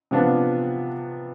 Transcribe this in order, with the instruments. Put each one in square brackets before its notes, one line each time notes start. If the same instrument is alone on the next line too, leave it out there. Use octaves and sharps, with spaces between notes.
[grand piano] C3 F3 B3 D4 F4